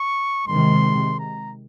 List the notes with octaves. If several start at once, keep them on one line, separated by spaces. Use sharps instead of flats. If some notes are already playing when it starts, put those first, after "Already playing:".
Already playing: C#6
C3 D#3 G#3 C6
A#5